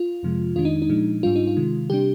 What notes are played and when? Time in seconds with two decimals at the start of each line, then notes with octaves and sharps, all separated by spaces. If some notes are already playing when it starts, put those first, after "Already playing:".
Already playing: F4
0.23 F2 C3 F3 G#3
0.55 F2 D#3 G#3 D4 F4
0.65 D#4
0.82 D#4
0.89 A#2 F3 G#3 D4
1.23 G#2 G3 D4 F4
1.36 D#4
1.47 F4
1.57 C3 D#3 G#3
1.90 C3 G3 D4 G4